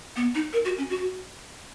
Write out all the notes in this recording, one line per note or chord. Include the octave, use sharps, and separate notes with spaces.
B3
D#4
A#4
F#4
C#4
F#4